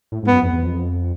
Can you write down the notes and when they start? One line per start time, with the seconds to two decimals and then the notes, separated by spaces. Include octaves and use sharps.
0.12 A2
0.23 G#2
0.27 B3
0.32 F#2
0.43 F2
0.53 E2
0.63 F2